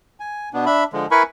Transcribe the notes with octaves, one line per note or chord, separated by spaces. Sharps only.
G#5
B2 B3 D4
D4 E5 B5
D3 F3 G#3
E4 A#4 B4 G#5 B5 C#6